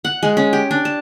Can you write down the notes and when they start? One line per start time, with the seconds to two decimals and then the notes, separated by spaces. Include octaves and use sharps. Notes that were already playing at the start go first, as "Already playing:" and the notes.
0.05 F#5
0.23 G#3
0.37 C#4
0.53 G4
0.71 D4
0.85 A5